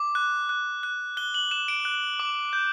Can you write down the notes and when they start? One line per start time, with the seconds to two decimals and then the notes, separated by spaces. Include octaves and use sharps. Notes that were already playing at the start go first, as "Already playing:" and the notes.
Already playing: D6
0.15 F#6
0.49 F#6
0.83 F#6
1.17 F#6 G7
1.34 F#7
1.51 F#6 E7
1.68 D7
1.85 F#6
2.20 D6
2.53 G6